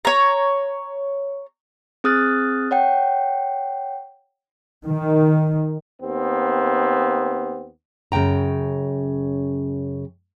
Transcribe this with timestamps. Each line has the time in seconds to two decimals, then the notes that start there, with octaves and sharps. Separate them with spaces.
0.05 C#5 A#5
2.04 C4 G#4 D#6 F6 F#6 A6
2.71 C#5 F#5 G5
4.85 D#3
6.02 D#2 B3 C4
8.12 F#2 C#3 B3 G5 A#5